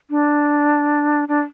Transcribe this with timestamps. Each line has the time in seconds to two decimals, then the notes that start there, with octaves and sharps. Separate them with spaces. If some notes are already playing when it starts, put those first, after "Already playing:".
0.10 D4
1.28 D4